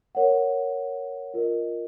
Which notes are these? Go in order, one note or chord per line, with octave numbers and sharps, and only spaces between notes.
A#4 C#5 F#5
F4 A#4 D#5